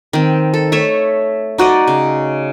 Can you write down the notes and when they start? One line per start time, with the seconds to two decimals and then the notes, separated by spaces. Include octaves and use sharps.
0.13 D#3 C4
0.54 A4
0.72 A3 C#5 E5
1.58 D#4 F#4 D5 D#5
1.88 C#3